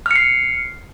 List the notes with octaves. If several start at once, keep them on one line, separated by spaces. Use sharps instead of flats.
F6 C7 C#7